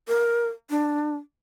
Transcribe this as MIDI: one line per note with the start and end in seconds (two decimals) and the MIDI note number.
0.08 0.47 70
0.70 1.15 62